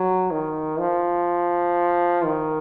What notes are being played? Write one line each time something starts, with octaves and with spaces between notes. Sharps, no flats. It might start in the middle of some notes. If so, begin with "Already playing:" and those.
Already playing: F#3
D#3
F3
D#3